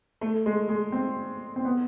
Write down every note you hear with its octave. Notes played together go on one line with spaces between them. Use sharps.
A3
G#3
G#3
C4
C4
B3